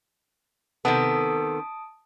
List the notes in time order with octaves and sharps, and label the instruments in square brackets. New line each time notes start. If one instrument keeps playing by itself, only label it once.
[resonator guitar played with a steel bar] C3 D#3 B3 [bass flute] A4 [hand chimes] A5 D#6 D7